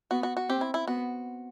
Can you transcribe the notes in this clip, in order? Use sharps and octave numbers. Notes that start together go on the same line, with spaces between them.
B3 F#4
F#4
F#4
C4 G4
E4
E4
B3 F#4